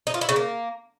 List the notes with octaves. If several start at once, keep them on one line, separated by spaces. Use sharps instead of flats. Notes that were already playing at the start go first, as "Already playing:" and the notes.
D#4
F4
E4
C#3
A#3